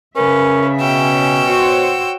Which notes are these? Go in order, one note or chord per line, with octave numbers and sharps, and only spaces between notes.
C#3 C#4 A#4 B4 E5
B2 C#4 G5 E6
F#4 C5 C#5